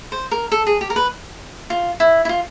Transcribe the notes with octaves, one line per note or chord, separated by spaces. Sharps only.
C5
A#4
A4
G#4
G4
A#4
B4
F4
E4
E4
F4